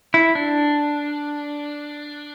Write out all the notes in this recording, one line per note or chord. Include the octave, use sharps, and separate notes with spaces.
E4
D4